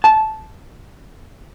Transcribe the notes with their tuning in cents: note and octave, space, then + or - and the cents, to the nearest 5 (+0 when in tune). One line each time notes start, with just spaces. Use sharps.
A5 -10